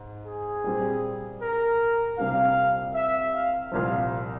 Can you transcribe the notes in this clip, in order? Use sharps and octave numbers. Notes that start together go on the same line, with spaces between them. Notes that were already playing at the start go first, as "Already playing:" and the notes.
Already playing: G#2
G#4
A#2 G3 C4
A#4
C2 C3 G3 A#3 F4 F5
E5
F5
C2 A#2 F3 F5